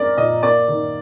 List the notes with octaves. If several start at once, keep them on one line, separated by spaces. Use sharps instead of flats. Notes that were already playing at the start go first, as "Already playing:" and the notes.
Already playing: G#3 C4 D4 A#4 D5
A#2 D#5
A#3 D5
D#3